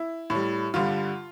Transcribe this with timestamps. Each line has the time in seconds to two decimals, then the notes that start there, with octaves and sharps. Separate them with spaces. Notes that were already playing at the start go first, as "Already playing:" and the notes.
Already playing: E4
0.30 A2 G3
0.74 G2 D3 G3 F4